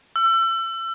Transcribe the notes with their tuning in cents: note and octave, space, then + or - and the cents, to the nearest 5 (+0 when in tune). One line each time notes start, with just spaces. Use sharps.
E6 +35